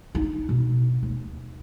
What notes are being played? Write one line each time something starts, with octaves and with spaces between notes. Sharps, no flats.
D4 D#4
B2
D#2